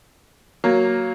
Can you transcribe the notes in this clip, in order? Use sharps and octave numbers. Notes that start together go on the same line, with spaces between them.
F#3 A#3